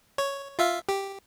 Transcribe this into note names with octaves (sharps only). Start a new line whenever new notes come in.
C#5
F4 E5 F5
G4